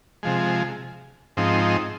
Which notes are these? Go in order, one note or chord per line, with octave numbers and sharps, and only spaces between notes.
C3 F3 G#3
G#2 F3 C4 D#4